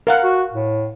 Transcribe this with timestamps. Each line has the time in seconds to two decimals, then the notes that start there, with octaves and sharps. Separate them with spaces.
0.07 A#4 F5 F#5
0.23 F#4
0.52 A2